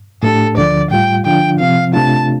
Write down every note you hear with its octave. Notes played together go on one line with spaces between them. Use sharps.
A2 A3 D4 G4 A4
D2 D3 F3 D5
A2 G3 F4 G5
D3 F3 D4 F4 G5
C3 F3 C4 F5
C3 A3 D4 F4 A5